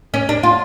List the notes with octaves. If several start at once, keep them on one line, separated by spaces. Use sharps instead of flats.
C#4
D4
F4